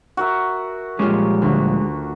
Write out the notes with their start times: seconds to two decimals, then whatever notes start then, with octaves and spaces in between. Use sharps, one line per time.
0.17 F#4 A#4 E5
0.99 A#2 F3 G3 G#3 C#4 F4 G4 G#4
1.42 D2